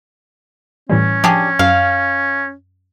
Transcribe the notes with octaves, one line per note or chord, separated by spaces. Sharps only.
A2 E3 G3 C#4
F3 D4 G4 G#4
F#2 F5